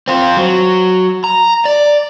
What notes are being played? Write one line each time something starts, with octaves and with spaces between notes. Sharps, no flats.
C4 F4
F#3
A#5
D5